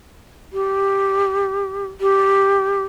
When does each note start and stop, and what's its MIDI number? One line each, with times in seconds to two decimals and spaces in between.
0.53 1.87 67
2.01 2.84 67